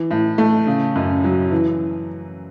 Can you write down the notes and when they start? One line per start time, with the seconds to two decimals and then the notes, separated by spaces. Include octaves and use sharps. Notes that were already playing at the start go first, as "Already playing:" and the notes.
Already playing: E3
0.11 A2
0.38 A3
0.67 C#3
0.96 F#2
1.24 F#3
1.51 E3